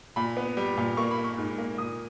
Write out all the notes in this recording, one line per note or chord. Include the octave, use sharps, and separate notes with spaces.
A#2 B5
B3
G3
A#2
A#3 C#6
B5
A#3
C#6
G#2
A#3
A#2 D#6